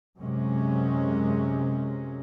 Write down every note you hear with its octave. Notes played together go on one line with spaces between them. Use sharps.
F#2 C3 F#3 G#3 C#4